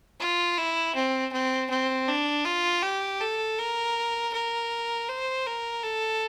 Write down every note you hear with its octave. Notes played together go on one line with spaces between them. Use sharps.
F4
E4
C4
C4
C4
D4
F4
G4
A4
A#4
A#4
C5
A#4
A4